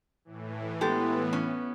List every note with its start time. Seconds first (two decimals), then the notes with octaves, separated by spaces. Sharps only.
0.25 A2 E3
0.81 G#3 B3 G4 A4
1.33 C#4